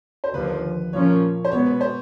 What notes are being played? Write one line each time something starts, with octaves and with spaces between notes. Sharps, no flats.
C5
D#2 D3 F3 B4
A#2 F3 A#3 C#4 C#5
C5
B2 G#3 B3 C#5
B4
C5